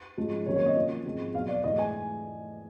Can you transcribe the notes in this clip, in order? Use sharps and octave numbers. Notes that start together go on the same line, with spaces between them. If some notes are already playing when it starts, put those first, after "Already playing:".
G#2 F3 G#3 C#4
C3 D#3 F#3 A#3 C#4 C#5
C#5
D#5
C3 F3 A#3 C#4
G#2 F3 G#3 C4
E2 B2 F#3 F5
D5
G#2 E3 A3 D#5
G#5